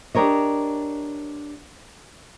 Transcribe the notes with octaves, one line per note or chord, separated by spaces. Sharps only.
D4 G4 A#4 C#5 D#5